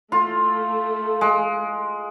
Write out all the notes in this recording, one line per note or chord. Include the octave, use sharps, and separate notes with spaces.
A3 F4
G#3